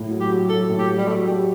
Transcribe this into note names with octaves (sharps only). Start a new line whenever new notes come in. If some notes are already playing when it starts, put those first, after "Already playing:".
Already playing: A2
F#3
G4
F#3
F#3 A4
A2
G4
F#3
G3
F#3 A3
G4